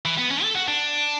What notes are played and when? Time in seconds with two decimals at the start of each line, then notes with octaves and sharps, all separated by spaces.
0.05 E3
0.18 B3
0.31 C#4
0.43 A4
0.55 F#4
0.68 D4